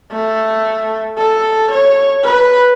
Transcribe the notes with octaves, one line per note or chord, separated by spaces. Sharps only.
A3
A4
C#5
B4